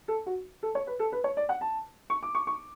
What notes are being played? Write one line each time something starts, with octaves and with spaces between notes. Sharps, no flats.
A4
F#4
A4
C#5
B4
A4
B4
C#5
D5
F#5
A5
C#6
D6
C#6
C#6